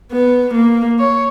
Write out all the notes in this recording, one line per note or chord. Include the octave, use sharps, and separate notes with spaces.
B3
A#3
C#5